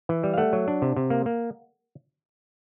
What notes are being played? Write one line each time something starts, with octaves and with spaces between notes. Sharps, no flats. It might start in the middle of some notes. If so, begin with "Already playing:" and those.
E3
G3
F5
A3 F#5
F#3
D4
C3
C3
A#3
A#3